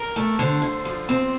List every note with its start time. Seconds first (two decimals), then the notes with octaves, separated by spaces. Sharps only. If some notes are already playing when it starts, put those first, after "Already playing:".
Already playing: A#4
0.16 A3
0.39 D3 C5
0.62 D3
0.85 F3
1.09 C4